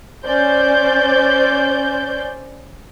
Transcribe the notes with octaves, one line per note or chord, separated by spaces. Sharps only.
C#4 C5 D5 G6